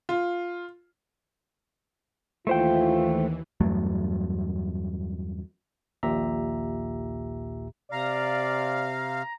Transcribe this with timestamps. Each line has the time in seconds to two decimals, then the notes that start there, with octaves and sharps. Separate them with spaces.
0.09 F4
2.47 D#2 E3 A3 F4 C5 G5
3.60 E2 G2 F#3 A3
6.03 A#1 D#2 A#2 G4 E5 A#5
7.92 C3 D5 F5 A#5